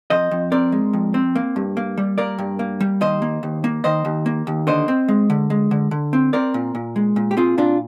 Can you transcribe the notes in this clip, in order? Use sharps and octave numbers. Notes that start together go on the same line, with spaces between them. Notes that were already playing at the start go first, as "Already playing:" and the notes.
F2 C5 D#5
F2
C4 A#4 D5
G#3
F2
C4
A#3
G2
A#3
G3
A#3 A#4 D5
G2
A#3
G3
D#2 C5 D#5
A#3
D#2
A#3
D#3 C5 D#5
D#2
A#3
D#2
D3 C5 D#5
C4
G#3
D3
G#3
D3
D3
C4
C4 A#4 D5
A#2
A#2
G#3
A#2
G4
C4 F4 G#4
A#2 D4 F4